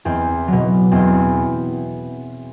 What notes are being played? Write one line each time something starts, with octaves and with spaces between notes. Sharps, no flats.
E2 C4
B2 F#3
E2 C4